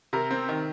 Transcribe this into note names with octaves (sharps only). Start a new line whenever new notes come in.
C3 A#4
C4
D#3